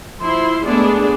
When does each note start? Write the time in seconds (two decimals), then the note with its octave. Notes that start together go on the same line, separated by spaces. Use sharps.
0.20 F3 E4 C6
0.63 G#3 A3 B3 D4 G#4